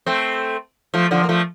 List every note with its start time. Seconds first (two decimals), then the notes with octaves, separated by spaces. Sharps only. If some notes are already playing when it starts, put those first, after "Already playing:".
0.06 A3 C4
0.94 F3 A3
1.11 D3 F3
1.24 A#3
1.29 F3 A3